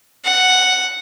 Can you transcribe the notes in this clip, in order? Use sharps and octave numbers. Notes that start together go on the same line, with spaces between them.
F#5